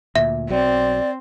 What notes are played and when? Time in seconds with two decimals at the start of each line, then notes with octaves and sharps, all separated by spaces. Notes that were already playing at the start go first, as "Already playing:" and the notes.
0.15 D2 A#2 E5
0.50 B1 F#3 C4 D5